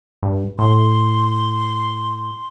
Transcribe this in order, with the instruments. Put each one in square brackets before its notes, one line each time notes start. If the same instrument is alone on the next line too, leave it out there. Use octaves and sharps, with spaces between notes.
[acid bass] G2
[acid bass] A2 [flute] C6